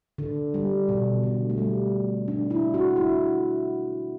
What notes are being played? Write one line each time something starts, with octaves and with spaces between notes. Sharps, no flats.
D3
G3
B2
D3
A3
G3
D4
E4
F#4
E4